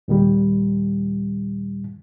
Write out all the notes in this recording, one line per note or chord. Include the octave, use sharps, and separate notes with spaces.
D#2 A#2 D#3 G3